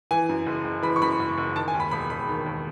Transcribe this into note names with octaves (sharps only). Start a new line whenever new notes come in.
E3 G#5
F#2
F#1
F#1
E3 B5
C#6
F#2 B5
F#1
F#1
D#3 A5
G#5
D#2
B5
E1 B5
E1 B5
D#3
D#2